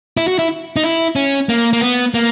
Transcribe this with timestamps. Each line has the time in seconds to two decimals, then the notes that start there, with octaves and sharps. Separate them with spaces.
0.17 E4
0.28 F#4
0.39 E4
0.76 D#4
0.84 E4
1.16 C#4
1.49 A#3
1.73 A#3
1.81 B3
2.14 A#3